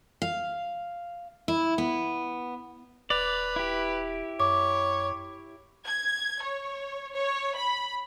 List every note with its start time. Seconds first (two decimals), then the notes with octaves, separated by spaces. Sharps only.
0.22 F5
1.48 E4
1.78 B3
3.10 D#1 B4 D5 F7
3.56 E4 G4
4.40 F#2 C#5 D6
5.87 G#6
6.42 C#5
7.16 C#5
7.55 B5